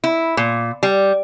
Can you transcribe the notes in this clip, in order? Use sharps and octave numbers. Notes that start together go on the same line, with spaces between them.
E4
A#2
G3